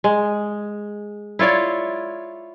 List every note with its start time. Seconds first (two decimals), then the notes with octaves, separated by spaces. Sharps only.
0.04 G#3
1.39 E4 F4 C#5 D5